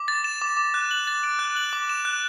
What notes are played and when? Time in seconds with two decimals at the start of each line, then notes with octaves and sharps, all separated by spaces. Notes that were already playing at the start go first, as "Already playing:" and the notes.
Already playing: D6
0.08 A6
0.24 E7
0.42 D6
0.57 D6
0.74 F#6
0.91 F#7
1.07 A6
1.23 D7
1.39 F#6
1.56 F#7
1.73 D6
1.89 E7
2.05 F#6